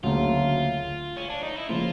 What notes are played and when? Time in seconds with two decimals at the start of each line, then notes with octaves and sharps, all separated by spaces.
0.03 D2 C#3 F#3 A#3 F4
1.17 C#4
1.30 D4
1.43 D#4
1.56 E4
1.69 C#3 F3 A#3 F4